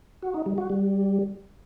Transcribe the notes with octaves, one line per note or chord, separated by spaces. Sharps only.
F#4
D#4
G3
F#4
G3